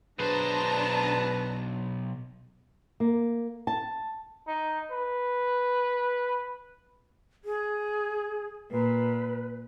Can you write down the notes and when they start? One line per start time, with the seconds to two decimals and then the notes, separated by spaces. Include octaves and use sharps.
0.20 B1 D4 F#4 G#4 B4 C5 A5 A#5
3.00 A#3
3.67 A5
4.47 D#4
4.91 B4
7.45 G#4
8.71 A#2 B4